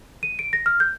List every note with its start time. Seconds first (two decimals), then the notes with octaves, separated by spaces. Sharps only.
0.23 D#7
0.39 D7
0.53 A#6
0.66 F6
0.80 G6